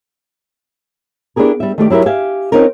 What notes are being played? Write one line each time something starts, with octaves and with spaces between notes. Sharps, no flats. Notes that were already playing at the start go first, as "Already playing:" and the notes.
B3 D4 E4 G4 G#4 A#4
G3 E5
D#3 A3 G4 D5
F#3 E4 G4 A#4 E5
G4 E5 F5 G#5
C4 C#4 D#4 F4 A#4